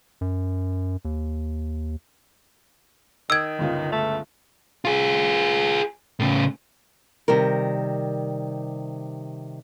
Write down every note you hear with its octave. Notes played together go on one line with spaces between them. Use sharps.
F#2
D#2
D#3 D#6 E6 G#6 D7
G1 C#2 F4
A3
F4 G#4
A2 C#3
C3 D#3 G3 A#4